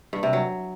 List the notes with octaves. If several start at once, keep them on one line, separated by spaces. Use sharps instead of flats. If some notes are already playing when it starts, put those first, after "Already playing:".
G2
C3
F#3